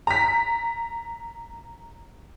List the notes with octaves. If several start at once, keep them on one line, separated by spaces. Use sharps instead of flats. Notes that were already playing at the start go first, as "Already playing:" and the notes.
A#5 B6